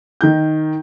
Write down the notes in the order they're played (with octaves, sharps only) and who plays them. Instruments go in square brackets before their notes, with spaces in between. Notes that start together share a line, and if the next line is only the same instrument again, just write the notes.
[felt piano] D#3 D#4 G6